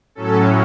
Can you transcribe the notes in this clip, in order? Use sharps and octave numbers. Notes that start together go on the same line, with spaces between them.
A2 F#3 C#4 A4